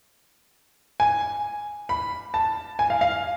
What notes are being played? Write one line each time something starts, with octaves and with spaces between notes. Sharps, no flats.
G#5
B5
A5
G#5
F5
F5